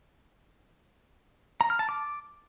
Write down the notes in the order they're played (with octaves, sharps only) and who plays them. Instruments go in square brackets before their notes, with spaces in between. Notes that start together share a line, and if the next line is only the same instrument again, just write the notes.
[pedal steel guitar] A#5
F6
A5
D6